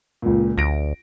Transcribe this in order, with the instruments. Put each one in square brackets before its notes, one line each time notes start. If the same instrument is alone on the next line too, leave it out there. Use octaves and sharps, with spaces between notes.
[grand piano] C#2 A#2
[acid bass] D2 [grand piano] A#6 D7